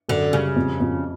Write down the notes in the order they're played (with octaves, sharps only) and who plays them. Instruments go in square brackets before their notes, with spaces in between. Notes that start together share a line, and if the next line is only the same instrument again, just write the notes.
[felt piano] F#2 [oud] D3
[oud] C#3 [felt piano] G3
[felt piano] F2
F2